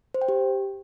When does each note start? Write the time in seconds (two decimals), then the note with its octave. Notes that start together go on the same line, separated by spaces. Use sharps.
0.14 C5
0.21 G5
0.28 G4